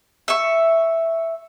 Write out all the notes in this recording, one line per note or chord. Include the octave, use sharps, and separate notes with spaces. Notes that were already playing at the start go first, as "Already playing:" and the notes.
E5 C#6